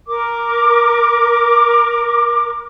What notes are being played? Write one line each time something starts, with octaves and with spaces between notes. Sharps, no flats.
A#4 D6